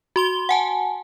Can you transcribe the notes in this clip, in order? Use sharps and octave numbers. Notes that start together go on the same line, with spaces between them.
F#4 C6 G7
F#5 G#5 A5